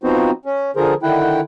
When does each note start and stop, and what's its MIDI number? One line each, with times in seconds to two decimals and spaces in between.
0.03 0.31 53
0.03 0.31 59
0.03 0.31 60
0.03 0.31 63
0.03 0.31 66
0.03 0.31 72
0.45 0.71 61
0.76 0.94 50
0.76 0.94 53
0.76 0.94 68
0.76 0.94 70
0.76 0.94 72
1.03 1.40 50
1.03 1.40 51
1.03 1.40 64
1.03 1.40 78
1.03 1.40 79